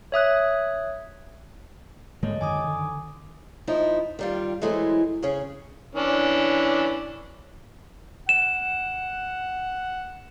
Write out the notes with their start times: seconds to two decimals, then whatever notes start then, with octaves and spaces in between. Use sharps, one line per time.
0.12 C#5 E5 D#6 F#6
2.23 G#2 D3 G#3 A#3 A4 C#5 D#5
2.41 F#2 D3 D#3 G#5 D6 D#6
2.67 D3
3.67 F3 D#4 E4
4.19 D#3 G3 F4
4.62 E3 F#3 G#3 A3 C4 E4
5.23 C#3 C#4 G#4
5.95 E3 C#4 D4
8.29 F#5 E7